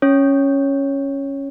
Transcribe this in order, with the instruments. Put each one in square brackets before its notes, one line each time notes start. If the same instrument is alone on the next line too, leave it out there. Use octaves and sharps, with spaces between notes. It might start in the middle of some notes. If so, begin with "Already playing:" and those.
[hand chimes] C#4 C#5